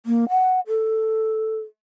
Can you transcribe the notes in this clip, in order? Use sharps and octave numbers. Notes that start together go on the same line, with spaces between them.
A#3
F#5
A4